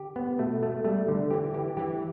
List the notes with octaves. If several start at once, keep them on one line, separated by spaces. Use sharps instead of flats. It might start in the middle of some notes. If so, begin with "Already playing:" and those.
Already playing: D3 G4
B3
B2 A3
A3
G3 A3
D3
E3 G4
E3 G4
E3 G4